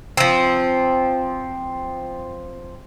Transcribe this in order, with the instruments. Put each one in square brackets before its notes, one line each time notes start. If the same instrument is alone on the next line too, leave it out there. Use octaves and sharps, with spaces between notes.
[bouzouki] F3 C4